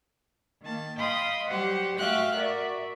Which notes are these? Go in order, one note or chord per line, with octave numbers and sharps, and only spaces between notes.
D#3 A#3 A5
D#5 F5 G5 B5 C6 D#6
F#3 G3 G4 C5 F#5
A3 F#4 E5 F5 G5 F#6
F#4 A#4 D5 E5